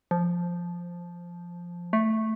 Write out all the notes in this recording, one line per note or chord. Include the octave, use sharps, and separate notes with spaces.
F3
A3